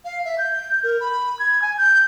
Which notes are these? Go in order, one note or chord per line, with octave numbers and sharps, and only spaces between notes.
F5
E5
G6
A#4
B5
G#6
G#5
G6